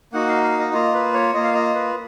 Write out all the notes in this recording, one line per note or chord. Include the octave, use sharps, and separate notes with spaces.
A#3 D#4 F#4 F#5
F5
F5
D#5
A#3 F4 D#5
B4
C#5
A#3 F4 D#5
F5
D#5
B4